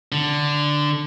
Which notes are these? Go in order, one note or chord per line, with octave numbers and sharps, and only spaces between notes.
D3